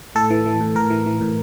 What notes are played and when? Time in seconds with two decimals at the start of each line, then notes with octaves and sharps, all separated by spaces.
0.15 A2 A4
0.30 E3
0.46 E3
0.61 A2
0.75 A2 A#4
0.90 E3
1.06 E3
1.21 A2